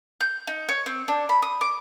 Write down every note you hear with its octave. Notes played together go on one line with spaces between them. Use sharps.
G6
D#4
C#5
C4
D4
B5
D#6
D6